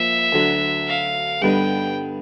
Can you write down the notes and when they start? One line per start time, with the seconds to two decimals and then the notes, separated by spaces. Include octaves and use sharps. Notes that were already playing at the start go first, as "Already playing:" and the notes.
Already playing: F3 A#3 E5
0.33 D2 D3 F#3
0.88 F5
1.42 G2 D3 G3 B3 D#4 G5